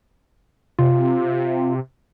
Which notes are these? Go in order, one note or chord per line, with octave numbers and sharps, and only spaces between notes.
C3 F4